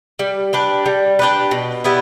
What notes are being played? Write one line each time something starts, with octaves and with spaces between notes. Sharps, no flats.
G3
D4 G4 B4
G3
D4 G4 B4
B2
G3 B3 E4